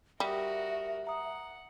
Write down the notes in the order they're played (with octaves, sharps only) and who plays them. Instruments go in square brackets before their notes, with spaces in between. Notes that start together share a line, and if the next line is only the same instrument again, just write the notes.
[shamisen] G3 [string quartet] F#4 A#4 [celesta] G4 D#6 [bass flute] E5
[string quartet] F#5 [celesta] A#5 D#6